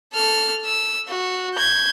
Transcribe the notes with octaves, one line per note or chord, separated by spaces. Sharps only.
A4 F6
E6
F#4
G6 G#6